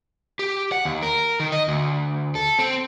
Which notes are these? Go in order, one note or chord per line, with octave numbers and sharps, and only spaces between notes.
G4
F#5
D#2
A#4
D#3
D#5
D2
A4
C4